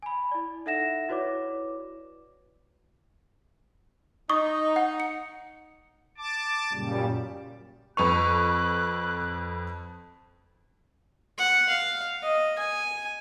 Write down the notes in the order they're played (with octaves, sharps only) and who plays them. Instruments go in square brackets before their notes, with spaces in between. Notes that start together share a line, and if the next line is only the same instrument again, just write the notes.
[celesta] G#5 B5
E4 D5
D#4 A4 E5 F#5 A#6 E7
E4 F#4 B4 C#5 D5 D6
[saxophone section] D#4 [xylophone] C#6 D#6
[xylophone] F#5
C#7
[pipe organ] A5 D6
F#2 A#2 C#3 G3
[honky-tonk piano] F2 B4 F7 [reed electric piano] C#6 [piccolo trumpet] F#6
[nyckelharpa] F#5
F5
D#5
G#5